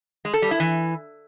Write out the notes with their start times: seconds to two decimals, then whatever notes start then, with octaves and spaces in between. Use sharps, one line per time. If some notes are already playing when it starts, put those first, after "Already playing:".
0.25 G#3
0.34 A4
0.42 G3
0.51 E4
0.60 E3